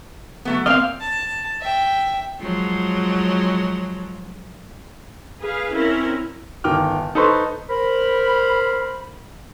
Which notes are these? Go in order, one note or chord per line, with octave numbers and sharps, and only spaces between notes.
F#3 A3 B3
A#3 C4 D#5 F5 F6
A5
E5 G5
F3 F#3 G#3
G#4 B4 F5
C4 C#4 E4 A#4
G1 D#3 G5 D6 F6
D#4 A4 B4 C5 C6 C#6
A#4 C5 B5